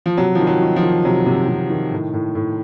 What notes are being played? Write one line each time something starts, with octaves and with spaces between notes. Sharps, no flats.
F3
C3 F#3
D#3 F3
F#3
D#3
F3
D#3
C3 F#3
C3
C3
D#3
A2
A2
A2